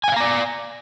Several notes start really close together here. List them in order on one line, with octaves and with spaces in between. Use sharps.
G#5 F#5 F5 A#5 D5